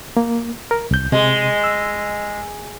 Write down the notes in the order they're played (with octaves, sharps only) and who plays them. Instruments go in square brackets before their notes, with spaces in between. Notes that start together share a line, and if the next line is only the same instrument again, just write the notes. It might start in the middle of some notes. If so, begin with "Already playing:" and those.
[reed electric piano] A#3
A#4
C2 G6
[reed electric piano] C3 [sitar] G#3
[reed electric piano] E6